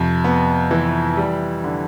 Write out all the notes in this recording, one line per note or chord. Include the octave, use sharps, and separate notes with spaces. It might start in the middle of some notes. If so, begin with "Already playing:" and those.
Already playing: F2 C3
B3
E3
G3
D3